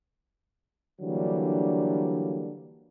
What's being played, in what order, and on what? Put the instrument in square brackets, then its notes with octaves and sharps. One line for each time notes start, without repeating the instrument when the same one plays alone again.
[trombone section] D3 E3 F#3 G3 A#3 D4